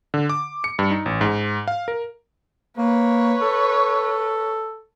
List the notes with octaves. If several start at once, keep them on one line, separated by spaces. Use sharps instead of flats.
D3
D6
C#7
G2
D#4
A1
G#2
F5
A#4
A#3 B4 C#5
A4